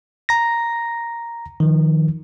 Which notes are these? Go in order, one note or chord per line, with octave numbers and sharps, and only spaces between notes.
A#5 A#6
D#3 F3